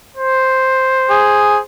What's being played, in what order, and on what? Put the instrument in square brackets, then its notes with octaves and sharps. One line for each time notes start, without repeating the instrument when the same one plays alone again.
[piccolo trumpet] C5
[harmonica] G#4